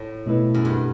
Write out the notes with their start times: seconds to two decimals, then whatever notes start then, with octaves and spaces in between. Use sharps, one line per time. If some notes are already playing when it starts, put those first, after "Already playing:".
Already playing: A2
0.26 B2 A3 E4 B4
0.54 F#2
0.65 G2